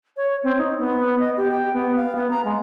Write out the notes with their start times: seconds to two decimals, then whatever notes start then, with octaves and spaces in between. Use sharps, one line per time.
0.17 C#5
0.43 C4
0.58 D#4
0.79 B3
1.20 D#5
1.37 G4
1.51 G5
1.73 B3
1.96 F5
2.15 B3
2.30 A#5
2.45 G#3